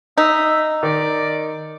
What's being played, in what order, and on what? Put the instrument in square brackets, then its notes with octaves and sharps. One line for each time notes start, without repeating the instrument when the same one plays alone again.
[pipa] D#4 [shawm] E5
[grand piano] D#3 [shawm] D5